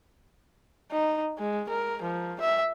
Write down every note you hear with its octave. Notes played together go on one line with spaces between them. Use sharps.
D#4
G#3
A#4
F3
E5